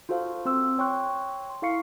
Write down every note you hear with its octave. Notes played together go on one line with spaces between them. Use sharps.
F4 F#4 A4 C5 F5
C4 C5 C6 E6
C#5 G5 C6 C#6 F#6
C6
E4 A4 F5 C#6 C7 C#7